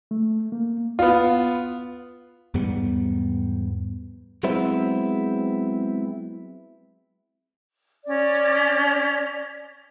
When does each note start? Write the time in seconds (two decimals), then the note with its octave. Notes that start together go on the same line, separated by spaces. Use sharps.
0.11 A3
0.52 A#3
0.99 B3 F4
2.54 E2 G#2 G3 B3
4.43 F#3 G#3 B3 C4 E4
8.05 C#4 D5